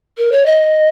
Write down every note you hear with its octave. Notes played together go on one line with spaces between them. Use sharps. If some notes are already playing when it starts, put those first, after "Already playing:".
A#4
C#5
D#5